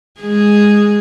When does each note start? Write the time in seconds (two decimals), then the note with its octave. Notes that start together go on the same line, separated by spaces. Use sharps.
0.21 G#3 G#4